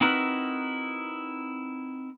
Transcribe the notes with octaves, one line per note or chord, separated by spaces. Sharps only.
C4 D#4 E4 F#4 A#4 B4